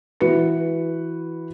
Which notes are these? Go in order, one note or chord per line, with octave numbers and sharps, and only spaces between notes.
E3 F#4 B4 C#7